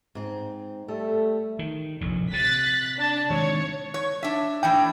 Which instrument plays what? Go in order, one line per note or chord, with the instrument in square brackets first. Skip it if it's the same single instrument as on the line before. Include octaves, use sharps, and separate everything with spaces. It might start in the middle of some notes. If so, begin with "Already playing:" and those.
[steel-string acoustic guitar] G#2 C4
[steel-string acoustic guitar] G3 [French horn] A3 [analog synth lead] A4
[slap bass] D#3
F1 A#1 A2
[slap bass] C3 [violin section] F#6 A6 B6
[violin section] D4 A5
[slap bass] D#3 G#3 C4 [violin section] C#5
[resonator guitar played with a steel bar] C#5
D4 E5
[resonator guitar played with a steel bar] A2 E3 D4 [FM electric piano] G5